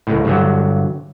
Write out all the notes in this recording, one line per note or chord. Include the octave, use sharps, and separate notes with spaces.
C#2 A2
G2 D3 F#3